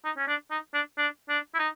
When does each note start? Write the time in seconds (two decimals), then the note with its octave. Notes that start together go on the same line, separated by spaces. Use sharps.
0.04 D#4
0.17 C#4
0.28 D4
0.51 D#4
0.74 D4
0.98 D4
1.29 D4
1.54 E4
1.59 D#4